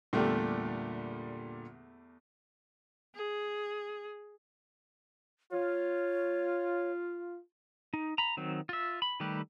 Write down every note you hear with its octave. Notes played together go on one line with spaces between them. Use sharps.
E2 A#2 D3 G3 A3 G4
G#4
F4 C#5
D#4
A#5 B5
D#3 F#3 C4
F4 E5
B5
D#3 G3 A3 G4 B4